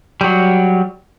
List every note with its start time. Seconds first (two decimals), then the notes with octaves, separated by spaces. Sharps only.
0.21 F#3 G3